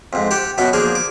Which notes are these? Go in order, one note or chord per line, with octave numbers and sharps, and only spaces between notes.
F2 G#2
G4 F#5 A5
F#2 B2 B3 F#4
F3 A#3 D4 G#4
D6